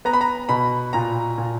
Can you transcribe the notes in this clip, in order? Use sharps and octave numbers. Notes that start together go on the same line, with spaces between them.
B3 A#5
B5
A#5
B2 B5
A#2 A#5
A#2